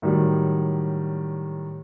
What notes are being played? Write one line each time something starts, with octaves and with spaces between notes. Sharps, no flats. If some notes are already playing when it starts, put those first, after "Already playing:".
A2 D#3 F#3 G3